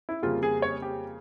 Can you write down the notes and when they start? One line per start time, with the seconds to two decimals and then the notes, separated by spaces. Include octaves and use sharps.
0.09 E4
0.22 F2 C#3 G3 A#3 F4
0.43 G#4
0.62 C#5
0.82 G4